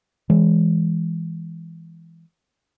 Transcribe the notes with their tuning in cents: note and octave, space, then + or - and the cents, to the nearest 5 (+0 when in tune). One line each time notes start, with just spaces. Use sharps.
E3 +5 G#3 +0